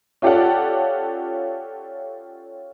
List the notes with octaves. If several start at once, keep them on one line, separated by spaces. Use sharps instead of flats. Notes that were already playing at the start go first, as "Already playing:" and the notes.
C#4 F4 G4 A4 D5 F#5